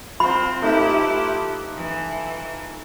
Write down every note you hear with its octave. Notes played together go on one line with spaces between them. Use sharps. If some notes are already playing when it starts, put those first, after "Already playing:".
C4 F4 C5 B5
A3 D#4 E4 G4 B4
E3